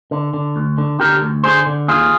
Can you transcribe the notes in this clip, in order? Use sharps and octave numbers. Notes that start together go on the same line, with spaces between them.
D3
D3
D2
D3
D3 G4 A#4
D2
D3 G#4 C5
D3
D#2 F4 G#4